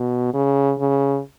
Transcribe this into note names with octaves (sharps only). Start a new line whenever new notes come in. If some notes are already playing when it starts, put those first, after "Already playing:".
Already playing: B2
C#3
C#3